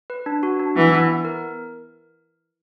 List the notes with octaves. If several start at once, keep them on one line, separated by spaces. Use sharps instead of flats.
B4
D4
F#4
D4
E3 B3
B3
B3
A#4